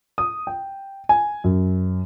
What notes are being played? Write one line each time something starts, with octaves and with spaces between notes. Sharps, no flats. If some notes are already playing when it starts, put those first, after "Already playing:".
D#6
G5
G#5
F#2